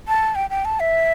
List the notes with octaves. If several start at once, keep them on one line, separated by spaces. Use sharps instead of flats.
A5
G5
G5
A5
E5